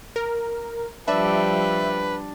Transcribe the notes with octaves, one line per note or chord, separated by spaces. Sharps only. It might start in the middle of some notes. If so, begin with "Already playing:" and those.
A#4
F3 G3 D4 B4 E5